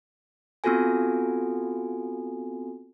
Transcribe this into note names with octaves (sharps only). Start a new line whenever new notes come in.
B3 C4 F4 F#4 A4 G#5